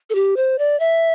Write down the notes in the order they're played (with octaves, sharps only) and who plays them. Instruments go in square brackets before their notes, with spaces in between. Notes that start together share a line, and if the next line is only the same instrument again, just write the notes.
[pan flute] A4
G4
C5
D5
E5